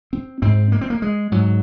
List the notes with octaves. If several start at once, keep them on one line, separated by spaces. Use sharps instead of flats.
C4
G#2 C4
A#3
C4
A#3
G#3
G#2 F#3